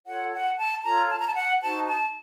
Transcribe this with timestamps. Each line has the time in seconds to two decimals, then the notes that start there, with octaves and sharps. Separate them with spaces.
0.06 F4 A4 C#5 F#5
0.32 F#5
0.58 A5
0.83 F4 A4 C#5 A#5
1.10 A5
1.19 A#5
1.27 A5
1.35 F#5
1.61 D#4 F#4 C5 A5
1.87 A5